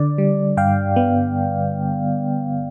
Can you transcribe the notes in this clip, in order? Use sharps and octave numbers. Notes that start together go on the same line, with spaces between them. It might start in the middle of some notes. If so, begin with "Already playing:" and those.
Already playing: D3 D5
G3
G2 F5 G5
B3